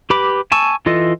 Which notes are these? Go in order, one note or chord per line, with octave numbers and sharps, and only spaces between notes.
G4 B4 B5 D6
G#5 A5 C#6 E6
E3 F4 A4 D#5